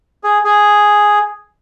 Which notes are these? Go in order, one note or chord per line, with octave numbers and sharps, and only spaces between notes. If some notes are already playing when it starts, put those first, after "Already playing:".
G#4
G#4